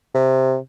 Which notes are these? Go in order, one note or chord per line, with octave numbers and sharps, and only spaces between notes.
C3